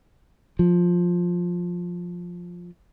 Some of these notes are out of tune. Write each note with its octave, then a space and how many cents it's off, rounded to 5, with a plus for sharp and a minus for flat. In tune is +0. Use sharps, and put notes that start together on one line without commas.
F3 +10